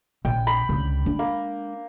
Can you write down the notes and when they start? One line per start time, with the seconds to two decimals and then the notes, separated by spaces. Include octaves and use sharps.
0.25 A#1 G5
0.47 B5
0.69 C#2 D3
1.05 G#3 D4
1.19 A#3